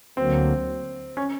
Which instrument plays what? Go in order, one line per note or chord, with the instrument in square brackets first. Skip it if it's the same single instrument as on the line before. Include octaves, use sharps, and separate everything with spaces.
[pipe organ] D2 D3 F#3 A#3 [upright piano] C4
[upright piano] C#4